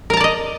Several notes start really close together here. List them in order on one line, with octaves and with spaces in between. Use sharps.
A#4 A#5 A5 D5 D#5